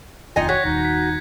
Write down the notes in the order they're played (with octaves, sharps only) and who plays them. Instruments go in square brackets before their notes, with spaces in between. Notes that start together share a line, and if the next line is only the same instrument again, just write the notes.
[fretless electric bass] F1 D#2 [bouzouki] D#4 G#5 [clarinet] F4 [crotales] A#6 C#7
[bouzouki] F#4 [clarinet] C#5 [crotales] F#6 G#6 B6
[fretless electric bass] D#1 D#2 [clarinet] D#4
[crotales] B6